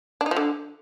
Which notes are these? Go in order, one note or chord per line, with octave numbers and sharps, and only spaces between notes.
D4
D#4
F3
D3